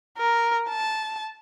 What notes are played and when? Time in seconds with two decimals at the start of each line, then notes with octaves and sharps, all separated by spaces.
0.18 A#4
0.69 A5